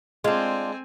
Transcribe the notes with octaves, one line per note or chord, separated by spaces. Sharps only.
G#3 C4 D4 F4 G#5